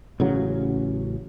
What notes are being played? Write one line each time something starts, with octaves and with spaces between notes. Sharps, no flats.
A1 C#3 F#3